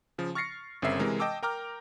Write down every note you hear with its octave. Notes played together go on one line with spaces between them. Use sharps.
C#3 F3
C#6 F6 A6 A#6 C7 C#7
G1 C#3 C4 A#4 E5 C7
C3 E3 G#3 A#4
D#5 G5 A5 D6 E6
A#4 G5 A#5 D6 F6